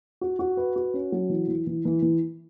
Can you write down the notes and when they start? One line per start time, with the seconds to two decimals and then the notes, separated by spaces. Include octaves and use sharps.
0.21 F#4
0.39 F#4
0.57 B4
0.76 F#4
0.94 C#4
1.12 F#3
1.30 E3
1.48 E3
1.67 E3
1.85 E3
2.02 E3